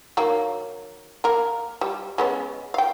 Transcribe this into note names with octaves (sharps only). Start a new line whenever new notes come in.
D#3 F#3 A#3
A#3 A#4
G3
G#3 B3 C#4
F5 G5